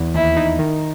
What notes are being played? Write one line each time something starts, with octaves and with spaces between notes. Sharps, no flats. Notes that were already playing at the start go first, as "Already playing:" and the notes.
Already playing: E2
D#2 E4
D#4
D#3